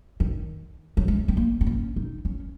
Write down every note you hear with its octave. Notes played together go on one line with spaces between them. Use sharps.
D#3
F#3
G#3
C4
A#3
C4
C#4
D#4
C#4